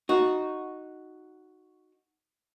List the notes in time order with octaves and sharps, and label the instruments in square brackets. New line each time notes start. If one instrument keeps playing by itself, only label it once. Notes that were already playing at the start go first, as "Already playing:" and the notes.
[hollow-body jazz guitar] D#4 F#4